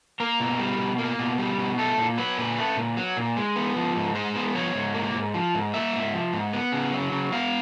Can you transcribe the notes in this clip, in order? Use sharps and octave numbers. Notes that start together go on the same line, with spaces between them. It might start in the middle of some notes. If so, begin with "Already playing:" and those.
A#3 A#4
B2
G3
B2
A#3
B2
G3
B2
A3 A4
A#2
F#3 B4
A#2
A3
A#2
F#3
A#2
G#3
B3
F3
G#2
G#3 C5
B3
F3 C#5
G#2
A#3
G#2
F3
G#2
A#3 E5
G#2
F3
G#2
B3
C#3
F#3
C#3
B3 F5